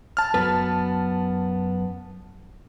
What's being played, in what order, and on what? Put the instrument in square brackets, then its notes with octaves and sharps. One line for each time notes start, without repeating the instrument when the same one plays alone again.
[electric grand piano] A5 F6
[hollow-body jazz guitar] F#2 B3 B4